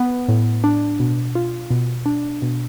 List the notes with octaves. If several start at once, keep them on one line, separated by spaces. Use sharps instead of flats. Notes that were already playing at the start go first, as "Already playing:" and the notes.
Already playing: B3
A2
D4
B2
F4
B2
D4
B2